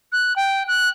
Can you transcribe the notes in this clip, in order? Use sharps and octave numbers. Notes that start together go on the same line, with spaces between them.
F#6
G5
F#6